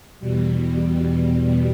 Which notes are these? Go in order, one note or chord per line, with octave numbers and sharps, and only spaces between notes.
E2 B2 G3